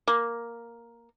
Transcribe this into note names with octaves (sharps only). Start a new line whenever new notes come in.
A#3